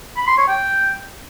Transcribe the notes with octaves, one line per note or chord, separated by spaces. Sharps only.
B5
C6
C#5
G5